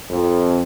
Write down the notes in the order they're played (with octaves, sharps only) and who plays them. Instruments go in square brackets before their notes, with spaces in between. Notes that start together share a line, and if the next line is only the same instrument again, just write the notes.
[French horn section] F2